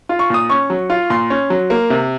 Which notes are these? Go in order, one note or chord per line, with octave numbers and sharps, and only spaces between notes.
F4
C#6
A#2 D#6
C#4 C#6
F#3
F4
A#2 C6
C#4
F#3
A#3
C3